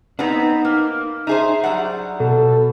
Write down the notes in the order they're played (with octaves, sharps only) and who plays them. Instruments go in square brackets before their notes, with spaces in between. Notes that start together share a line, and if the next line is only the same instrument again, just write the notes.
[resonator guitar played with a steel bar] B3 C4 [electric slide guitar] D4 D#4 A#5
[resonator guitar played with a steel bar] A#3
[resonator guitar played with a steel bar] D#4 G#4 C5 [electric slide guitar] E5
[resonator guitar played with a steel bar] F#3 G3 F#5
[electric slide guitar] B2 [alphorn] A4